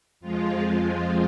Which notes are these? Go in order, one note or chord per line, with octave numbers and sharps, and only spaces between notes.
F2 F3 G#3 F4
F4